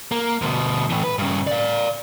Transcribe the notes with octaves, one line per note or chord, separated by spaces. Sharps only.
A#3
D2 B2
A2 E3
B4
G2 C#3
D5 F5